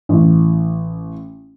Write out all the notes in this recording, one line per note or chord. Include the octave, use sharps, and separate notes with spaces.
A1